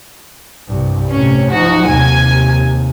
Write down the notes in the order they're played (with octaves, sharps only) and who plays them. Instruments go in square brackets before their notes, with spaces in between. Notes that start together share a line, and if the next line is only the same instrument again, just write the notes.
[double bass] C2 G2
[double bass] A2 C3 [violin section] C#4
[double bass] F3 D#4 [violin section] F#4
[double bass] D#2 C3 [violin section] G#5